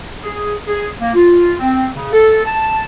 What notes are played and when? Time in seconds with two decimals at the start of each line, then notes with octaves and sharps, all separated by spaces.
0.23 G#4
0.67 G#4
1.00 A#3
1.15 F4
1.59 C4
1.95 C#3
2.13 A4
2.45 A5